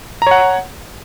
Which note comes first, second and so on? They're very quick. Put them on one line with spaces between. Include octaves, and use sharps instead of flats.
A#5 C#5 F#5